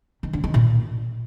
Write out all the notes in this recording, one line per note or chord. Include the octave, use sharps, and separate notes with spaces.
D#3
D3
D#3
A#2